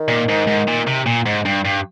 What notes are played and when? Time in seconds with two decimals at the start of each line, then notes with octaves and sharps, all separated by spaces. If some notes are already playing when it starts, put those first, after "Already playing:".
Already playing: D#3
0.08 A#2
0.29 G#2
0.47 G#2
0.68 A#2
0.87 C3
1.06 A#2
1.26 G#2
1.46 G2
1.65 G2